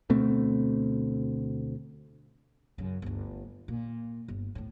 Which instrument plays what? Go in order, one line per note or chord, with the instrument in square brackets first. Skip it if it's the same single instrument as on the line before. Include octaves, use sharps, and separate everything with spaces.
[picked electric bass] D2 B2 A3 C4
[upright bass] F#2 C#3
G1 D2
A#2
G1
D2 A2